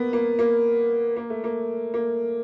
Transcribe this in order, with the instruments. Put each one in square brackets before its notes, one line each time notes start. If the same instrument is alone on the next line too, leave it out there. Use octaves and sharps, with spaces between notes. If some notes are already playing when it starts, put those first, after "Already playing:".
Already playing: [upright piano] A#3 B3
A#3
A#3
A#3
A3
A#3
A#3